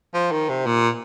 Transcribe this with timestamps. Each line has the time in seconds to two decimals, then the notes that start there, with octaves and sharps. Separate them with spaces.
0.14 F3
0.32 D#3
0.49 C3
0.66 A#2